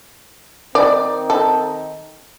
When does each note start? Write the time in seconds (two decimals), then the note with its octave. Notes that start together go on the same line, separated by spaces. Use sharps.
0.75 D#3 C4 D#4 D5
1.30 A4